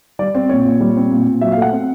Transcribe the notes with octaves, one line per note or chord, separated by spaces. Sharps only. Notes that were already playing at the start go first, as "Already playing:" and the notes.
G3 D5
C4
A#2 C#5
A#2
G3
C4
A#2
A#2
F#3 E5
A3 F5
F#5
C4